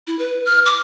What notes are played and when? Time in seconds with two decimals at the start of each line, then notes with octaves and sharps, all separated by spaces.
0.07 E4
0.19 B4
0.45 F6
0.65 D6